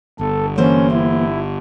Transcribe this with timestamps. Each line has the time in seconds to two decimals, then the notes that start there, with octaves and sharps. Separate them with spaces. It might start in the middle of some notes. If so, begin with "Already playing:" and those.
0.19 G1 A4
0.58 E3 A#3 C#4 C5
0.91 E4